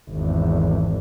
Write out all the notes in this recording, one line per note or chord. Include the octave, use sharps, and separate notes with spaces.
G#1 E2